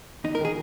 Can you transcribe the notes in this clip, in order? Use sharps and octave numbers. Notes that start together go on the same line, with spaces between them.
E2 D#4
A#4
D#3 G#3 G#4